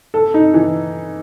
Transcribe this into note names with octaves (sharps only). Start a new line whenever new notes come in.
A4
D#4
E3